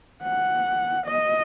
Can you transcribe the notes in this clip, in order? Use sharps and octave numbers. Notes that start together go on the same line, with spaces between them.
F#5
D#5